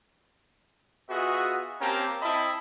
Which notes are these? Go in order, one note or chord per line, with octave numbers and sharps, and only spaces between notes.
B3 F4 F#4 G#4 D#5 E5
A#3 C4 C#4 G4 A5 A#5
C4 E4 D#5 E5 A5 B5